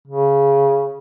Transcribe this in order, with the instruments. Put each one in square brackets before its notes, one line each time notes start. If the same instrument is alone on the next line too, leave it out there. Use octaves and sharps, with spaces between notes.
[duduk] C#3